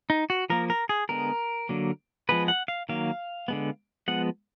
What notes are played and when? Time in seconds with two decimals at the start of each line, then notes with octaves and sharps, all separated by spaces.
0.10 D#4
0.30 F#4
0.50 F3 A#3 A#4
0.70 A#4
0.89 G#4
1.09 D3 G#3 B3 A#4
1.69 D3 F#3 A#3
2.29 F3 G#3 B3 B4
2.48 F#5
2.68 F5
2.89 D#3 F#3 A#3 F5
3.48 D3 G#3 B3
4.08 F3 G#3 B3 F#5